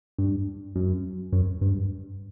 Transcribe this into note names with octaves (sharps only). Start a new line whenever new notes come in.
G2
F#2
F#2
G2